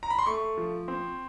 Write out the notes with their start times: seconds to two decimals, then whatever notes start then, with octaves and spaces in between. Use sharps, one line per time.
0.03 A#5
0.10 B5
0.19 C6
0.26 A3 C#6
0.58 F3
0.88 C4